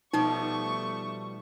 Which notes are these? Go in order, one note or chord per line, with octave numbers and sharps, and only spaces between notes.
B2 F3 G3 A3 D#4 C#6